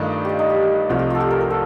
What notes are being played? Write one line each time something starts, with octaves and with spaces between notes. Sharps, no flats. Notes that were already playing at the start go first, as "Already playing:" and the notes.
Already playing: G2 D#3 A3 D4 D#4 F4
F4 G4
D#4
G4
C2 C3 F3 A3 F4
G4
F4 A4
G4
A#4
A#4
A4